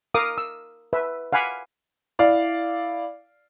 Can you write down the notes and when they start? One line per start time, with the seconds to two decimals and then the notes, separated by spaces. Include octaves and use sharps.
0.14 A#4 F5 D6 D#6
0.38 E6
0.93 B4 E5
1.33 F5 F#5 G#5 B5 D6
2.19 E4 D5 F5